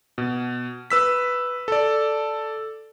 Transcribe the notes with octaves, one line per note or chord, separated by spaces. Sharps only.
B2
B4 E6 B6
A4 D5